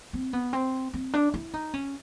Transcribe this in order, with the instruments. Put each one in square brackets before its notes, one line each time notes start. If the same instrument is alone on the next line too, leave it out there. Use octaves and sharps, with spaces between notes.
[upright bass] C4
B3
C4
C4
D4
E4
D#4
C#4